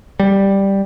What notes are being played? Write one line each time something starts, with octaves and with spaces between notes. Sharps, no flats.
G3